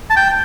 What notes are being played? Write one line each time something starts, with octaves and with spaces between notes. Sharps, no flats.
A5
G5